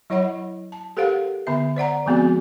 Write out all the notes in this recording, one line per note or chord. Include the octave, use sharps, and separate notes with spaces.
F#3 E4 C#5 D#5 F#5 B5
A5
G4 A4 A#4 C5 F5 F#5
D3 B3 E5
C5 D5 F#5 A#5
F3 G#3 B3 C4 F#4 G#4